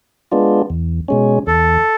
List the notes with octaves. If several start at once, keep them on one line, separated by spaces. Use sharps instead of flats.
G#3 B3 D4 F4
E2
B2 G#3 C#4
E2 A4